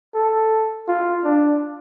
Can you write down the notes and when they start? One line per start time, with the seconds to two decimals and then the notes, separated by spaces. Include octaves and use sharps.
0.14 A4
0.88 F4
1.25 D4